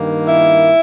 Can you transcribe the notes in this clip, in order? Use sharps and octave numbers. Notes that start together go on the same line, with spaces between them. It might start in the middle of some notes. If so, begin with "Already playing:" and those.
Already playing: G2 D#3 A#3
E4